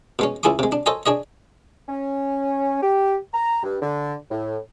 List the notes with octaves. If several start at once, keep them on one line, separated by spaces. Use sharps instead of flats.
B2 G#3 C#4
C#2 E4 G#4 G#5 C6 D6
C3 G#3
D4
A4 C5 C#5 D#5 G#5
D4 G#4 C#5 D#5
C#4
G4
A#5
G2
D3
A2